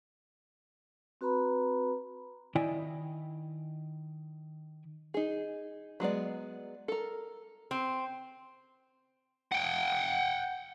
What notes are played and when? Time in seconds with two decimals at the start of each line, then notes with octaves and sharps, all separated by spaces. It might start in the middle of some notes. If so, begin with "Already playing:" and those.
1.21 C4 F#4 B4 A#5 B5
2.55 D#3 E4 D5 D#5 G5 G#5
5.14 D#4 G#4
6.00 F#3 G#3 B3 D5
6.88 A4 A#4
7.71 C4
9.52 F#5 G5